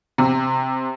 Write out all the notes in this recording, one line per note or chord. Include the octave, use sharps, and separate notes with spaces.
C3